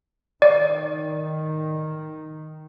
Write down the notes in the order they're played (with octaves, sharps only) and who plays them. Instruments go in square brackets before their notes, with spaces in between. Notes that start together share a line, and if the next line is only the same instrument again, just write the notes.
[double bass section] D#3 [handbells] D5